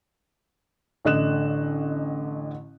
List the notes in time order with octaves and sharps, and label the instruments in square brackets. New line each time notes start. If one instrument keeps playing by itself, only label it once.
[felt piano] A1 D3 D#5 F#6 E7